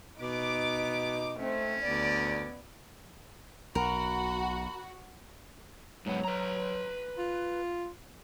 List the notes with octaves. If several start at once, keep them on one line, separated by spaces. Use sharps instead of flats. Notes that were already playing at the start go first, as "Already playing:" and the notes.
B2 B3 D#4 D6
A3 C4 C#4
D2 B3 D5
B1 F#4 A#4 B5
G#2 F#3 B3
B4 A#5
F4